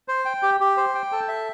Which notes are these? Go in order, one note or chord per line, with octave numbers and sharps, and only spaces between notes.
C5
G5
G4
G4
C5
G5
A4
E5